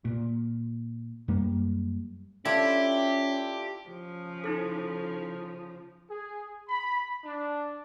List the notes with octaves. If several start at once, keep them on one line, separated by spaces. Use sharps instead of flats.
A#2
F#2 G3 A#3
C#4 D4 E4 F4 G4 A4
C#3 F3
D#4 E4 A4
G#4
B5
D4